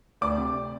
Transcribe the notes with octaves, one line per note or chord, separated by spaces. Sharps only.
D2 D5 D6
C3